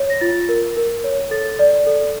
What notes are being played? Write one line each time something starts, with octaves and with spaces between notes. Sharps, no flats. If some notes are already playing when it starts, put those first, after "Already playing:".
Already playing: C#5
A#6
F4 A6
A#4
A#4
C#5
A4 A6
D5
A4